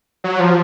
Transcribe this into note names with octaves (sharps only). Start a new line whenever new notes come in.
F#3
F3